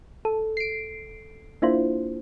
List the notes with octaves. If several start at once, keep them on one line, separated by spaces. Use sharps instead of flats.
A4
C7 D7
A#3 D4 E4 F4 C5